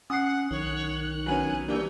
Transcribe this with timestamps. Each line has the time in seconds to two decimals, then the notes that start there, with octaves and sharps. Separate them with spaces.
0.10 C#4 F#5 D#6 C7
0.51 B1 D#3 C#5 F#6
1.26 F#3 B3 C#4 G#5
1.68 C3 E3 G3 A#3 D4 C#5 G6